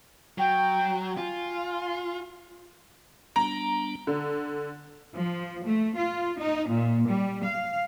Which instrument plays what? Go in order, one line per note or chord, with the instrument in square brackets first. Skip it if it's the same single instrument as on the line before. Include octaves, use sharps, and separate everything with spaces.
[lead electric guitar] F#3 [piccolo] G5
[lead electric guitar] F4 [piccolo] G#5
[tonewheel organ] G3 B3 D4 [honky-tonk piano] A#5
[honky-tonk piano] D3
[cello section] F3
A3
F4
D#4
A#2
G3
F5